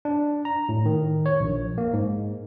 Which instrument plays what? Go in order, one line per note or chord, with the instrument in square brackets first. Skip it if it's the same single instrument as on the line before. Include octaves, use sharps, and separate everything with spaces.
[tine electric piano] D4
A#5
A2
D#3
C#5
A#1
A#3
G#2